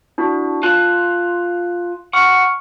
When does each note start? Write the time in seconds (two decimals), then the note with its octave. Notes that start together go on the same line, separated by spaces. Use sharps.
0.18 D4 E4 F#4
0.63 F4 F5 A5 F#6
2.13 F#5 C#6 F6